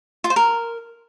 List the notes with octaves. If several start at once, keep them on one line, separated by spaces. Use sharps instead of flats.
F4
C5
A#4